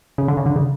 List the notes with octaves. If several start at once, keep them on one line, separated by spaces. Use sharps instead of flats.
C#3
D3
C#3
D3
C#3